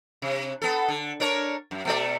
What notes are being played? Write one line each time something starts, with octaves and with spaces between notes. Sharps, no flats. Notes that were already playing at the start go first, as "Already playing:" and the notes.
C3
B3 A4
D3
D4 A#4 C#5
F#2
B2 A3 D5